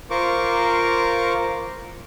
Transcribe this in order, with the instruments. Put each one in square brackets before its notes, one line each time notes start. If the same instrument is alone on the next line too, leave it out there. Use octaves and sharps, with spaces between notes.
[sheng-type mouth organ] F4 A#4 C5 C#6 D6